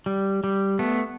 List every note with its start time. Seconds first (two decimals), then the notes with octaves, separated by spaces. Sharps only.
0.06 G3
0.44 G3
0.79 A3 B3